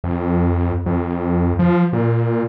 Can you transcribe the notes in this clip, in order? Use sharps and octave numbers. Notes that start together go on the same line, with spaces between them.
F2
F2
F3
A#2